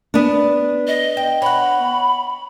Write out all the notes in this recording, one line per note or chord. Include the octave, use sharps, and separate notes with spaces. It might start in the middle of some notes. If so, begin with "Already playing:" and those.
B3 D4
D#5
G5
C#5 F#5 B5